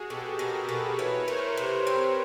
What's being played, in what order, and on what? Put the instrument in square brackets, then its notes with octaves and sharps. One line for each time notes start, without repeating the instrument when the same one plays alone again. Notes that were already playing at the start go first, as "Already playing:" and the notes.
Already playing: [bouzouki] G#3 [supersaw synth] F#4 G#4
[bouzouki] B2 [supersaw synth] G4 A4
[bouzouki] B2 [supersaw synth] G#4 A#4
[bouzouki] B2 [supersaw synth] A4 B4
[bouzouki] E3 [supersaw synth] B4 C#5
[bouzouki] A3 [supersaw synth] A#4 C5
[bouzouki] C3 [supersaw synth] A#4 C5
[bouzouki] C4